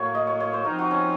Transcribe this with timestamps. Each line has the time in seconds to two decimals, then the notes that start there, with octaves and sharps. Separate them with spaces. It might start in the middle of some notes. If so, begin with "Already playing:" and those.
Already playing: A2 F#3 A#3 C#5
0.15 D#5
0.27 C#5
0.40 C#5
0.53 C5
0.65 F3 C4 D#4 A#4
0.79 F#4
0.91 C#4